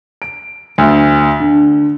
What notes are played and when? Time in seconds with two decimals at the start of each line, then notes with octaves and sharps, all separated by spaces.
0.22 D7
0.78 D2
1.40 D3